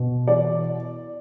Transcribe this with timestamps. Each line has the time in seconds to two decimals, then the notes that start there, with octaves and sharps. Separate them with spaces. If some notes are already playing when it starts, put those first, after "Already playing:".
Already playing: B2
0.28 E3 D5